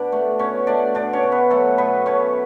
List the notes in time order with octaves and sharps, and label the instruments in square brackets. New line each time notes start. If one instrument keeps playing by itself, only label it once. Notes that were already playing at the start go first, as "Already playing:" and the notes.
Already playing: [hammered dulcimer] B2 D4 D5
A3
B2 C#4 C#5
A3 D4 D5
B2 D4 D5
C#4 C#5
B2
B3 B4
F#3 A3 A4
B2 B3 B4
B2 C#4 C#5